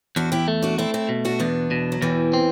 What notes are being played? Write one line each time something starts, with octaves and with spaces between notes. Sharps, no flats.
E2 D4 F#4
E4 G4
A3
D4 F#4
A3 C4 E4
C4 E4
B2
D4 F#4
E2 B3 D4
B2
F#3
E2 E3 G3
C4